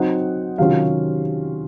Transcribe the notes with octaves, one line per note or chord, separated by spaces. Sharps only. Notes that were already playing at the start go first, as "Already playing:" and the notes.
Already playing: F#3 C4 D#4 F#5
C3 D#3 F#3 C#4 F4 F5